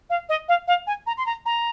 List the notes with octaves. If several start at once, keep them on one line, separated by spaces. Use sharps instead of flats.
F5
D#5
F5
F5
G#5
A#5
C6
A#5
A#5